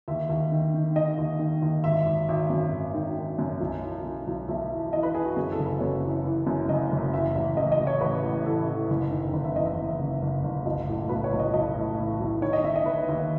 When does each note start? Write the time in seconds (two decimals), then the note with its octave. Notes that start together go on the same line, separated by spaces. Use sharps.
0.08 D#2 E5
0.29 D#2
0.52 D#3
0.74 D#3
0.96 D#3 D#5
1.18 D#2
1.39 D#3
1.62 D#2
1.84 G#1 E5
2.06 G#1
2.29 G#1
2.50 F#2
2.72 G#1
2.94 D#3
3.17 D#3
3.39 F#2
3.61 B1
3.83 E3
4.04 B1
4.27 B1
4.48 B1 E5
4.70 E3
4.93 E3 D#5
5.03 B4
5.15 E3 G#4
5.25 F#4
5.36 F#2 G#4
5.52 A4
5.59 F#1
5.66 B4
5.80 F#2 C#5
6.03 E3
6.25 E3
6.47 F#2
6.68 F#1 D#5
6.91 F#1
7.13 E3 E5
7.35 A1
7.57 A1 D#5
7.72 D#5
7.79 A1
7.87 C#5
8.01 A1 B4
8.23 A2
8.45 E3 A4
8.67 E3
8.89 F#1
9.11 D#3
9.33 F#1 B4
9.44 E5
9.55 E2 D#5
9.66 E5
9.77 E2
10.00 F#1
10.22 F#1
10.44 F#1
10.66 B1 D#5
10.87 A2
11.09 B1 B4
11.24 C#5
11.32 B1
11.39 D#5
11.53 B1 D#5
11.75 A2
11.97 E3
12.20 B1
12.41 D#3 C#5
12.53 D#5
12.64 D#3 E5
12.76 D#5
12.86 D#3 B4
13.09 D#2